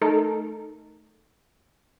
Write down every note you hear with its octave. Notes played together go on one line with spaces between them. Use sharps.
A3 D#4 A4 A#4